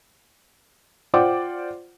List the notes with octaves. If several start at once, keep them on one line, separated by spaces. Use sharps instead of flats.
F4 C5 D5 F#5 G5 D6